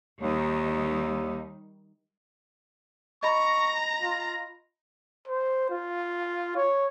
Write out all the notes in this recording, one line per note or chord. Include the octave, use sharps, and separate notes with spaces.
D#2 D#3 G3 D#4
D#5 A#5 B5 C#6 A#6
F4
C5
F4
C#5